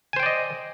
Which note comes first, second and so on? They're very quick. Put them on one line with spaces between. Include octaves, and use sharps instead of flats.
G#5 C5 G5 D5 D#5